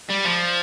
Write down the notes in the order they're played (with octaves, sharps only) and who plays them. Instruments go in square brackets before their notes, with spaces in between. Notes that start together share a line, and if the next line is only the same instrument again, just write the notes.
[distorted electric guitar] G3
F3